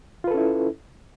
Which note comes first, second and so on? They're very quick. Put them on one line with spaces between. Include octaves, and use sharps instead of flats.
F4 B4 A4 C#4 E4